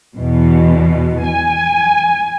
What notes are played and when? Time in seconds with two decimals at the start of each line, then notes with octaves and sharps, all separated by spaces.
0.18 E2 B2
1.25 G#5